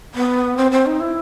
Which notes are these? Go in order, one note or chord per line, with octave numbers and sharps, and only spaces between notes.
B3
C4
C4
D#4
E4